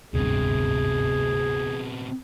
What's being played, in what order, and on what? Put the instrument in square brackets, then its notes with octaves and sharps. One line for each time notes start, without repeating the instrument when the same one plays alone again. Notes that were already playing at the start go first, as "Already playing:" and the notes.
[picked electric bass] D1 G#1 G2 [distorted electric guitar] C3 B3 [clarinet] G#4